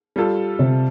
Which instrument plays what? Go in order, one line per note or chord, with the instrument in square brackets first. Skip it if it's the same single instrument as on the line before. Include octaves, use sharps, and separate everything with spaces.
[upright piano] G3 F4 A4
[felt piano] C3